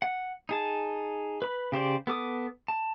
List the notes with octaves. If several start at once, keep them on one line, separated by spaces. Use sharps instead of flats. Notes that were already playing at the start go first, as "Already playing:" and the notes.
F#5
D#4 G#4 A5
B4 B5
C#3 G4 C5 D5
B3 A4 D6 D#6
A5